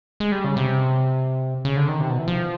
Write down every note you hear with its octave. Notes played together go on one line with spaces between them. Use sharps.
G#3
G3
C#3
C3
C#3
D3
D#3
C3
B2
E3
F3